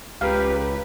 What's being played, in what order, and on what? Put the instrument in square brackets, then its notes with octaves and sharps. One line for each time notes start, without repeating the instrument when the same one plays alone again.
[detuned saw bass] C#2 [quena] G4 [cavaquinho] A#4 F5 [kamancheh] B4